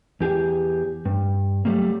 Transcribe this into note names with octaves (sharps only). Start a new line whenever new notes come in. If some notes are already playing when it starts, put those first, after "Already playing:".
E2 G4 G#4
G2
F#3 G3 A3 A#3